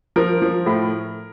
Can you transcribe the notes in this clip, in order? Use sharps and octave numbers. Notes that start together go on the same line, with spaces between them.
F3 A#4
F3
A2